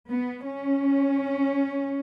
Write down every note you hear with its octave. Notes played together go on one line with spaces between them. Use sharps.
B3
C#4